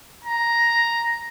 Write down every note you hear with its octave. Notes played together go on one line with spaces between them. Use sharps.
A#5